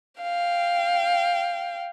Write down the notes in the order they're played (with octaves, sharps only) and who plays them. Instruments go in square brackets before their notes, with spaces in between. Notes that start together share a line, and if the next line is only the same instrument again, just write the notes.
[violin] F5 G5